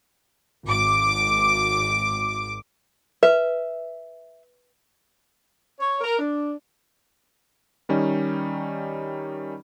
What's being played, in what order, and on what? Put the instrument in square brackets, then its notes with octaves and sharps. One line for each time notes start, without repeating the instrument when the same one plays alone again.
[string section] G#1 D6
[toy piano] B4 [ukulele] E5
[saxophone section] C#5
A#4
D4
[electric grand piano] D#3 G3 C#4 D#4